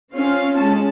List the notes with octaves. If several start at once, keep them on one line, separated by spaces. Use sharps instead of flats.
C4 C#4 F4 F5
G#3 C#4 A5